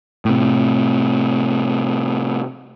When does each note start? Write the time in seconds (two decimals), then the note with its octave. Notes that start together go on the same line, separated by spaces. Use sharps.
0.25 A2 C3